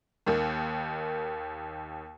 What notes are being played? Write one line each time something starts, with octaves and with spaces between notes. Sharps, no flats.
D#2 D#3